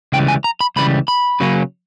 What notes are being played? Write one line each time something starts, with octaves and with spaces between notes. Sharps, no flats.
C#2 C#3 E3 G3 G5
G#5
A#5
B5
C#2 C#3 E3 G3 B5
B5
C#3 F#3 A#3 C#4